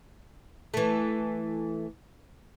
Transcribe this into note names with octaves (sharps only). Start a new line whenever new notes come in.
E3 A3